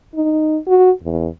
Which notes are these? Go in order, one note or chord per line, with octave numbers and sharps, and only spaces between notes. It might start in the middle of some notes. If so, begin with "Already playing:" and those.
D#4
F#4
E2